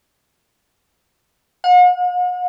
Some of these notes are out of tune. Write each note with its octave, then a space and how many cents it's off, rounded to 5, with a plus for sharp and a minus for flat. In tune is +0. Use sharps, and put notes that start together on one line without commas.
F#5 -45